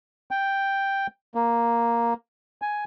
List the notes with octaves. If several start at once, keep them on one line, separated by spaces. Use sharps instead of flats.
G5
A#3
G#5